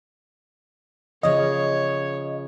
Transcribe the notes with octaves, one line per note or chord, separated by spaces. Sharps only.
C#3 F3 C#5 D#5